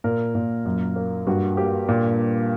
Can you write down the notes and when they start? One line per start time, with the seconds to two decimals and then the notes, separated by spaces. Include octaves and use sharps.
0.04 A#2 A#4
0.35 A#2
0.65 F#2
0.96 A#3
1.27 G2 F#4
1.57 A#3 G4
1.89 A#2